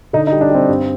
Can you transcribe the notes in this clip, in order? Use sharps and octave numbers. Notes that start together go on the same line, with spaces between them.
D3 D#4
D#4
G3
D4
G3 C4
G2